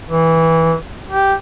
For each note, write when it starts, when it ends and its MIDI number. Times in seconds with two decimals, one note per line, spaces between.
0.10 0.76 52
1.09 1.34 67